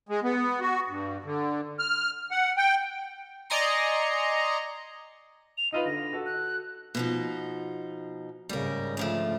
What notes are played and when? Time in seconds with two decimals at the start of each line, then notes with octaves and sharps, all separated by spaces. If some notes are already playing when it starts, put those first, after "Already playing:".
0.09 G#3
0.23 B3
0.61 F#4
0.88 G2
1.25 D3
1.79 F6
2.31 F#5
2.57 G5
3.50 D5 D#5 G#5 A#5 C6 C#7
5.58 F7
5.72 D#4 F4 B4 D#5
5.86 D3 A#6
6.13 F#4 A4
6.26 F#6
6.95 B2 F3 D#4
8.49 G#2 C#3 G3 A#4
8.97 D2 F3 A3